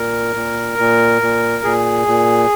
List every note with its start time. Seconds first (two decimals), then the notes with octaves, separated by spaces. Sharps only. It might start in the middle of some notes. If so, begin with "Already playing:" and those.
Already playing: A#2 A#4
0.36 A#2
0.79 A#2
1.22 A#2
1.64 A#2 G#4
2.07 A#2